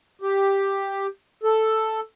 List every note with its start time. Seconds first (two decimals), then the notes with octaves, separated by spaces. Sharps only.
0.22 G4
1.44 A4